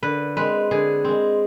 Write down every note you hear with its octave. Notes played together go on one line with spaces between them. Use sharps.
D3 B4
G#3 C4 B4
D3 G#4
G#3 C4